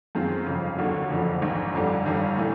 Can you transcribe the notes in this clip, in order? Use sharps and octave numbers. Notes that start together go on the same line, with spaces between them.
F#2 D#3 G#3 C4 F4
G1 F2 C#3
D#2 D3 F#3
F#1 F2 D3 F3
A#1 G#2 D#3
G1 F2 D3 G3
G1 G2 D#3 G3
A2 E3 A3